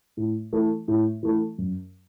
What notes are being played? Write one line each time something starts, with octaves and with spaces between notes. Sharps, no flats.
A2
E3 A3
A2
E3 A3
F#2